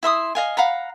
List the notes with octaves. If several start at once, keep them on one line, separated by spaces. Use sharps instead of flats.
E4 E5 C6 D#6
D#5 F5 G#5
F5 F#5 A#5 B5